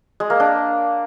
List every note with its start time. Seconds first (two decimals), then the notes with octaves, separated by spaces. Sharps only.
0.20 G#3
0.30 A#3
0.40 D4